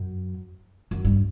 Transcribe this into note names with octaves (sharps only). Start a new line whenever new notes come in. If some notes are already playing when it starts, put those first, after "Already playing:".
Already playing: F#2
F#2
G2